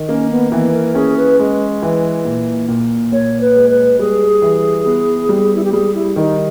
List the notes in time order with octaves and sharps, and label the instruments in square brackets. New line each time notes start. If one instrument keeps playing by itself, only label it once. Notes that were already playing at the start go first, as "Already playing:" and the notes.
Already playing: [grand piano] D#3
[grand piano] A#3 [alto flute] C#4
[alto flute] B3
[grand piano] E3 [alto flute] B3
[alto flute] A#4
[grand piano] C#4 [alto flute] G#4
[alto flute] B4
[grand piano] G#3
E3
A#2
A#2
[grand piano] A#2 [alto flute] C#5
[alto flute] B4
[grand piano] G#3
[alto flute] B4
[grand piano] G3 [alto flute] G#4
[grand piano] E3
B3
G3
[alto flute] E4
G4
[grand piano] G3 [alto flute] G#4
[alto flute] E4
[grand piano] D#3 [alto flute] D#4